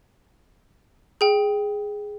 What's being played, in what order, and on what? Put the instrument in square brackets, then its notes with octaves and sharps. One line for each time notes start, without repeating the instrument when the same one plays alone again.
[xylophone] G#4 G5